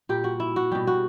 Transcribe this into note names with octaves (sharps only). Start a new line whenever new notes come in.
A#2 G3 G4
F#4
E4
F#4
B2 G3 G4
F#4